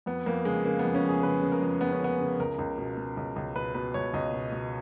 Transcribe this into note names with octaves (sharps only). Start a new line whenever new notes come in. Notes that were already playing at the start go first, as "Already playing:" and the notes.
F2 B3
F2 A#3
C#3 G#3
C#3 A#3
F2 B3
C#4
F2 G#4
C#3 B4
C#3
A#4
F2
F2 B3
C#4
C#3 B3
C#3
C#2 A#4
C#2
B2
B2
C#2
C#2
B2 B4
B2 B4
C#2 C#5
C#2 D#5
B2
B2